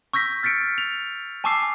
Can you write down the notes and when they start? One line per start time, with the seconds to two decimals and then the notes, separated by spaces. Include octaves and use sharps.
0.13 C#6 E6 G6 A#6 B6
0.43 F6 A6 B6 C#7 D7
0.78 F7
1.44 G#5 A5 C#6 D6 E6 C7